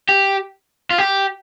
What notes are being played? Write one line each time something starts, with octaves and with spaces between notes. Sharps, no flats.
G4
F4
G4